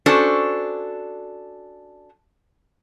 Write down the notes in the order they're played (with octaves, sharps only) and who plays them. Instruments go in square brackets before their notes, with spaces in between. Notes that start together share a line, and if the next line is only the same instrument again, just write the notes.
[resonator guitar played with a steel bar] C#4 D4 F#4 A4 C5